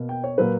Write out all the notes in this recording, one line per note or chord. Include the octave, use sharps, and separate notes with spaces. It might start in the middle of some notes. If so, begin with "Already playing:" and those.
Already playing: B2 A#3
G5
C#5
A#2 F#3 A#3 B4